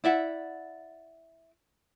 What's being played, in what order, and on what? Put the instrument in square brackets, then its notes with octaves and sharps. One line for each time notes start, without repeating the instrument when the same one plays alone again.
[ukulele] E4 D5 E5 F#5